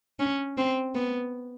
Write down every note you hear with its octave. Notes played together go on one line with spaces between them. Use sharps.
C#4
C4
B3